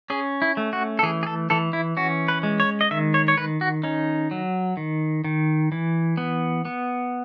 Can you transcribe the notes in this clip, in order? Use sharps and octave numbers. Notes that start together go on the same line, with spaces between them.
C#4 G#4
E4
A3
F#4
A4
E3 G#4
G#4
A4
E3 A4
E4
C#4 F#4
B4
G#3
C#5
D#5
D#3 E5
C#5
C#5
D#3 B4
F#4
C#4 D#4
F#3
D#3
D#3
E3
B3
B3